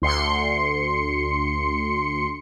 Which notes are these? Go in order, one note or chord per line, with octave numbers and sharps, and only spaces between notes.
D2 C6 C#7